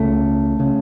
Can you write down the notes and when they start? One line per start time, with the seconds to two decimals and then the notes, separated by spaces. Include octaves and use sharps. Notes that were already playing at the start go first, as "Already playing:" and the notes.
Already playing: C#2 C#3 A3
0.60 C#3